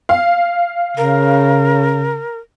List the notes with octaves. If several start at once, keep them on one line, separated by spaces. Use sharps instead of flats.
F5
C#3 A#4